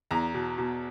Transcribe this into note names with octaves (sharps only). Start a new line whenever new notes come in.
E2 A#5
B2
B2